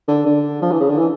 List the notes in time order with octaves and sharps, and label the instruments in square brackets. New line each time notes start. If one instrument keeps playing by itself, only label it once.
[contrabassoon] D3
D3
F3
E3
C#3
D3
E3